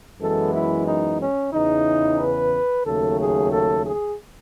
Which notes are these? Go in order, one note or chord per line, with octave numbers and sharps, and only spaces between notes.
F#2 E3 G#3 B3 A4
E4
D#4
C#4
E2 C#3 E3 D#4
B4
D#2 C#3 F#3 A3 A4
G#4
A4
G#4